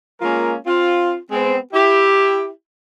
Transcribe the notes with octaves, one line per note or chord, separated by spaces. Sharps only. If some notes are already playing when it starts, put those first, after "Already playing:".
G#3 A#3 C#4 F4 A#4
C4 F4
G#3 B3 C4
E4 G4